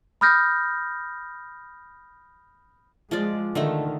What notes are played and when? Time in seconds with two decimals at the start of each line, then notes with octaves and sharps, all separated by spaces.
0.21 B5 D#6 F6 G6 A#6
3.11 F3 G#3 F4 D5
3.55 D3 D#3 A3 D#4